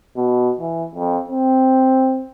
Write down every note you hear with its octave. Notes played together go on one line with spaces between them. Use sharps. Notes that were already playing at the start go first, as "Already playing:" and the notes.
B2
E3
F2
C4